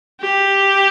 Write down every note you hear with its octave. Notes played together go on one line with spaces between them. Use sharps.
G4